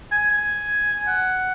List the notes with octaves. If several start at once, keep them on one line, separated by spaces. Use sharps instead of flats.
G#5
G#5
F#5